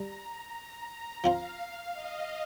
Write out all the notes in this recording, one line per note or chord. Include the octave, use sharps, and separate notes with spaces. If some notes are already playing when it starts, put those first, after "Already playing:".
Already playing: G3 A#5
A#5
F3 C4 F4 C5 F5
D#5